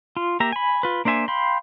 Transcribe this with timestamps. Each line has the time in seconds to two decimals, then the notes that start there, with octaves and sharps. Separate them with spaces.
0.17 F4
0.40 A#3 G4 E5 A#5
0.52 G#5 B5
0.83 F4 B4
1.05 A#3 D4 C5 E5 G#5
1.28 F5 G5 B5 C6